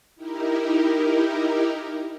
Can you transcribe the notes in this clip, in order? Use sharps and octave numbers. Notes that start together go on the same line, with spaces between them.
D#4 E4 G4 A#4